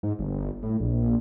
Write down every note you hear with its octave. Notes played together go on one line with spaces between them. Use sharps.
G#2
G1
A2
A#1